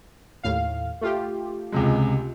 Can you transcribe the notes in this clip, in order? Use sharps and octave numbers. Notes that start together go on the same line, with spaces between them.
D#2 A2 F5
A3 F4 G4
C#2 C3 G#3